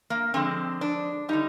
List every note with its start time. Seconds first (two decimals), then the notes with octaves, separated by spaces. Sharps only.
0.10 A#3
0.34 D3 F3 G#3 C4
0.81 D4
1.29 D3 G3 D#4